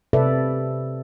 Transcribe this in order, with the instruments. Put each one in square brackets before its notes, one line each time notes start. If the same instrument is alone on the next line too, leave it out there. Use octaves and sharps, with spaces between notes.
[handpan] C3 A4 B4 D5 E5